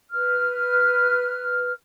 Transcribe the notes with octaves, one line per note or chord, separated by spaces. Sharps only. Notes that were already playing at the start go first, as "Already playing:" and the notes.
B4 F6